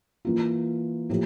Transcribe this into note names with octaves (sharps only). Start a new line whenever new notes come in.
E3 A#3 F4
A2 F3 A#3 E4 G4